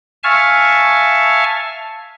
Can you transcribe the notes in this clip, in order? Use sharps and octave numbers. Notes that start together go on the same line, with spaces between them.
E5 F5 G#5 A5 C#6 F6